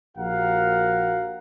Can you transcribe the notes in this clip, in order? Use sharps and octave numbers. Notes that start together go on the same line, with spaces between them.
A#1 F#4 G4 A#4 F5 F#5